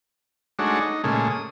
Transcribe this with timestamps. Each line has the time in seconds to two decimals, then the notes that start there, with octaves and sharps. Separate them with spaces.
0.59 G#3 A3 D4 D#4 F#4 C#5
0.81 D#4
1.04 A#2 C#3 G#3 A3
1.30 D#6